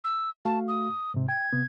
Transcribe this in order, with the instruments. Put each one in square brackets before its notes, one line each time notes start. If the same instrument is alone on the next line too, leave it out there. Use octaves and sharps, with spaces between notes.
[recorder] E6
[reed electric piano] A3 F#4 F5 [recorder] A5
[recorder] D#6
[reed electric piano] G#2 C3
[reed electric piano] G5 [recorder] G#6
[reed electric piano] C3 B3